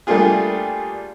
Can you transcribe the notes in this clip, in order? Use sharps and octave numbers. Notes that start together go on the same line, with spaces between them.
G3 A3 A#3 D4 F4 G#4